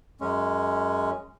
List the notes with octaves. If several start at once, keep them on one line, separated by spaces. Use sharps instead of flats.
F#2 G#3 C#4